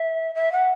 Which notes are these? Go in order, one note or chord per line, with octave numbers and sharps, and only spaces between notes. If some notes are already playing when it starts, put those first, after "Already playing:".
Already playing: E5
E5
F#5